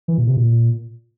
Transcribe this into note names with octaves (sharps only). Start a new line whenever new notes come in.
E3
A#2
C3
A#2